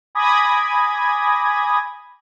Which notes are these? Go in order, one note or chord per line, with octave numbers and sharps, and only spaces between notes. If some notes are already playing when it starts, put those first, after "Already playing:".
G#5 B5 D6 D#6 G#6 A#6